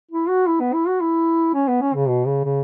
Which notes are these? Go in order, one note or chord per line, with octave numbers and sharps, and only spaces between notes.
E4
F#4
E4
B3
E4
F#4
E4
C#4
B3
C#4
C#3
B2
C#3
C#3